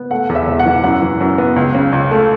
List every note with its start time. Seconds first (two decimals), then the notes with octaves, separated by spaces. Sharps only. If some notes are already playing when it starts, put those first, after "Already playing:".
Already playing: B3
0.11 A3 F#5
0.29 E2
0.35 E5
0.47 E1
0.59 F#5
0.66 E3
0.84 F#2 F#5
1.02 E3
1.21 F#2
1.38 B3
1.56 C#2
1.75 C#3
1.93 C#2
2.11 A3